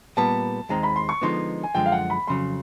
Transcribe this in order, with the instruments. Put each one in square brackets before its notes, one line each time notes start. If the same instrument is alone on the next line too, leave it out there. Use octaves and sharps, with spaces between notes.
[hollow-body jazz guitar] A#2 G3 B3 [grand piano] A5
[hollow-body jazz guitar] D#2 D#3 G#3 C4 [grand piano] A#5
[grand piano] B5
C6
C#6
[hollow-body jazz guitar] D3 F3 G#3 B3 D#4 [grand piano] C6
[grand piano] G#5
[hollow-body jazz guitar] F#2 D3 F3 G#3 [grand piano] G5
[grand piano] F5
F#5
B5
[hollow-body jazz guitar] F2 C#3 F#3 [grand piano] C6